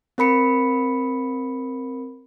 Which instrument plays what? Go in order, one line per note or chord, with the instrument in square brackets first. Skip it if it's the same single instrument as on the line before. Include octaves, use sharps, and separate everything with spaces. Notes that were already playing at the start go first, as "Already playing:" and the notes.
[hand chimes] C4 A#4 B5 C#7